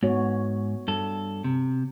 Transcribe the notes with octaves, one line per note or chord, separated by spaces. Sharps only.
G#2 B3 F#4 C#5
G2 A4
C3